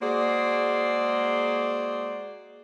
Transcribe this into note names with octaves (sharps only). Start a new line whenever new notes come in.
G#3 A#3 F#4 G#4 C5 D5